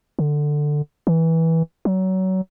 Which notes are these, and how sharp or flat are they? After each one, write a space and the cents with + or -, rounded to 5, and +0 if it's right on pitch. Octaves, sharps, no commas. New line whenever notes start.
D3 +10
E3 -15
F#3 +25